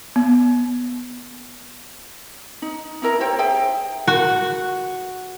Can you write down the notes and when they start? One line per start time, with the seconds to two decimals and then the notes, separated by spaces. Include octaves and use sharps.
0.16 B3
2.62 D#4
3.02 D#4 E4 A#4 A#5
3.20 G4 C5 C#5 G5
3.39 G#4 E5 G5
4.07 F#4